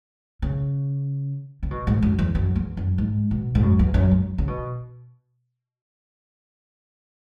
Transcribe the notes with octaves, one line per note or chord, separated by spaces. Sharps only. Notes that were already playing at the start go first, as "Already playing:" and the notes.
C#3
C#3
B2
G#2
F#2
E2
F#2
E2
F#2
G#2
B2
G#2
F#2
E2
F#2
F#2
C#3
B2